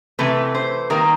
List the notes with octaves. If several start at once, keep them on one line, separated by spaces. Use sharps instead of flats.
C3 E3 A3 C4 B4
C5
D#3 G3 A#3 A#4